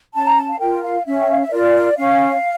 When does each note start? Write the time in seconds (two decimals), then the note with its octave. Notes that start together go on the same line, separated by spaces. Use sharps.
0.14 C#4 A5
0.26 A#5
0.37 A5
0.49 F5
0.59 F4 A#4 G5
0.82 F5
1.05 C#4 E5
1.20 G5
1.31 F5
1.41 E5
1.51 F4 A#4 D5
1.97 C#4 F5